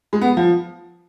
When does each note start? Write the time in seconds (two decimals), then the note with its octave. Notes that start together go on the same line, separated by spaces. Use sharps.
0.13 G#3
0.21 B3
0.37 F3